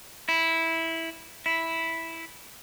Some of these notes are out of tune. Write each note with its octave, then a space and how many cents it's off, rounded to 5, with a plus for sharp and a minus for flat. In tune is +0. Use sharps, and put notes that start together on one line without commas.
E4 -10
E4 -5